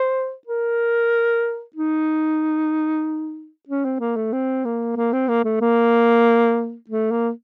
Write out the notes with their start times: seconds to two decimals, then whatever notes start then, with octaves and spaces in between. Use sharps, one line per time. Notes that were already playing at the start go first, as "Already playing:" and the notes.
Already playing: C5
0.47 A#4
1.76 D#4
3.68 C#4
3.85 C4
4.00 A#3
4.16 A3
4.33 C4
4.65 A#3
4.96 A#3
5.13 C4
5.28 A#3
5.45 A3
5.61 A#3
6.89 A3
7.11 A#3